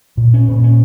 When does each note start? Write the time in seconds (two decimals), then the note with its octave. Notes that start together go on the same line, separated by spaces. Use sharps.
0.17 A#2
0.34 C#4
0.48 A#2
0.63 C#4